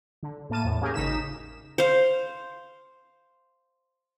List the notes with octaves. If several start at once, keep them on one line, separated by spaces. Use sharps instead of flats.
D3
A2 A#3 A5 D#7
E2 A2
A#3 C#4 G4 G#4 A#4
G#1 C#3 D#4 B6 E7
C5 F5